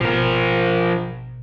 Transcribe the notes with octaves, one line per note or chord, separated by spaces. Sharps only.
G#1 B2 F3 A#4